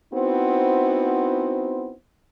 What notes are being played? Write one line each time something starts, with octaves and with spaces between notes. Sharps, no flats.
B3 C4 D#4 E4 F#4 C5